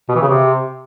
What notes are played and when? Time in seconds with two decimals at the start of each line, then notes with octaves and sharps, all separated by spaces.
0.09 B2
0.15 E3
0.22 C#3
0.28 C3